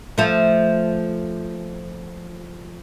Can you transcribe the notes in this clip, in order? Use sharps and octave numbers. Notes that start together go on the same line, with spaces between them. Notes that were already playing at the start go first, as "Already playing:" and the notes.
F3 A3